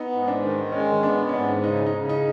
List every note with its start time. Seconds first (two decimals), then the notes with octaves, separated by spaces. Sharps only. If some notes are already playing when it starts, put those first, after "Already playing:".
Already playing: B3 D#4
0.12 G#2
0.28 D4
0.43 D#3
0.72 G#3 C#4
1.03 B3 D4
1.29 C#4
1.34 G#2 D4
1.64 C#3 D#4
1.86 D#4
1.94 C#3
2.09 D#4